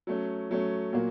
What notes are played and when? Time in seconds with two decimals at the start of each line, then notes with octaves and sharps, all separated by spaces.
0.07 F#3 A3 C#4
0.51 F#3 A3 C#4
0.93 A#2 F#3 A#3